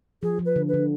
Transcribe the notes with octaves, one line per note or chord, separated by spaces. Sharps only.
F3 G#4
F3
B4
D3
B4
D3